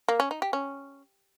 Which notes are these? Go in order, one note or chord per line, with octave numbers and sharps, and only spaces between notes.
A#3
C#4
D#4
G4
C#4